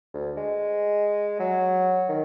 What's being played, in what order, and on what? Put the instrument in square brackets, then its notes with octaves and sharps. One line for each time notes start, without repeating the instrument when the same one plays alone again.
[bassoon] D2
G#3
F#3
D#3